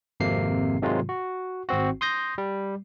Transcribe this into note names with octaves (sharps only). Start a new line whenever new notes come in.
G#1 F2 C3 A#3 C7
G#2 C3 D#3 F#3 G#3 F4
F#4
G#1 C4 F#4
C6 D#6 G6 A#6
G3